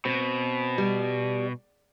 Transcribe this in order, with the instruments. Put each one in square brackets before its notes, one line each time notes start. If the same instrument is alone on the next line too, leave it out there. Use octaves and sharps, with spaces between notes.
[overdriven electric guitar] B2 [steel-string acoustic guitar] C4
[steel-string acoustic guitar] G3